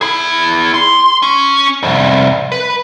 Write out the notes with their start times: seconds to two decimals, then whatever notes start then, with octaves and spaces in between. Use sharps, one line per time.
0.01 E4 G#4
0.74 C6
1.22 C#4
1.83 C2 F2
2.52 B4